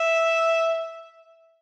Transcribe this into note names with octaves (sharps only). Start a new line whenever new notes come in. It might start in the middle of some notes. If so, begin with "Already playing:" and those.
Already playing: E5